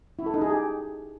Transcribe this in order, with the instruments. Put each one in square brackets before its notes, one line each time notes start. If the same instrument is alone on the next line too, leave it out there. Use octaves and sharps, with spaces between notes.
[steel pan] E4
A4
D#4
G#4
G4